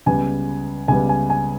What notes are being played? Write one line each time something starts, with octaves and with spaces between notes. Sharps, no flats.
C#2 C#3 G3 B3 G#5
C#2 C#3 G3 B3 G#5
G#5
G#5